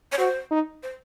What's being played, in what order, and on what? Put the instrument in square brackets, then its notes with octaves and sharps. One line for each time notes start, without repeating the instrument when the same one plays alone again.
[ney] C#5
[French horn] F#4 [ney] C5
[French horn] D#4
[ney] C5